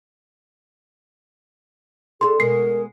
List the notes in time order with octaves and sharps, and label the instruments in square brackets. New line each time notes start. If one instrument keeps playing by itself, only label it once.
[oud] D4 E4 A4 [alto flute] G#4 [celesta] C6
[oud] B2 G#3 [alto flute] A#4 [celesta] C7